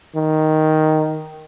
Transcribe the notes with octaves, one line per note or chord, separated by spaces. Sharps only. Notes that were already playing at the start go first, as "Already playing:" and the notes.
D#3